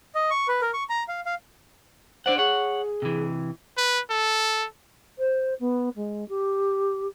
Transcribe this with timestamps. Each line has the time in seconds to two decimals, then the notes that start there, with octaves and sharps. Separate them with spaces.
0.15 D#5
0.31 C#6
0.48 B4
0.61 A#4
0.74 C#6
0.89 A#5
1.08 F5
1.26 F5
2.26 D4 C5 D5 F#5
2.38 G#4 C#5 F#5
3.02 C3 E3
3.77 B4
4.10 A4
5.18 C5
5.59 B3
5.96 G#3
6.29 G4